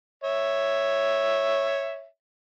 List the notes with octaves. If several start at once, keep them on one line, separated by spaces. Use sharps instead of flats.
C#5 E5